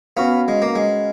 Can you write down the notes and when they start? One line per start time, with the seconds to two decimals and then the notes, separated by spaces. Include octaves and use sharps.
0.16 B3 C#4 F#4 B4 F5
0.48 G#3
0.62 A#3
0.75 G#3